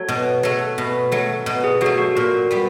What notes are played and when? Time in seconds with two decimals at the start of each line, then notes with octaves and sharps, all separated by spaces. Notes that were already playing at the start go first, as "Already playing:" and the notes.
Already playing: F#3 A3 C#5
0.08 B2
0.43 F#3 A3
0.78 B2
1.12 F#3 A3
1.46 B2
1.64 G#4
1.81 F#3 F#4
1.86 A3
1.98 F#4
2.16 A#2 F#4
2.51 G3 B3